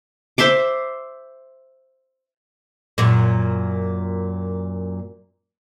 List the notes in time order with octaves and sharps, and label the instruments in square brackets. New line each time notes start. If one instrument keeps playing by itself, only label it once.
[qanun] C5 E5 C6 D6
[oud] F#2 A#2